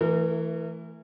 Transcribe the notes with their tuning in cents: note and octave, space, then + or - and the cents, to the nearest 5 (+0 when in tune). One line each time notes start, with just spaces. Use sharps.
E3 +0 A3 +15 A#4 -35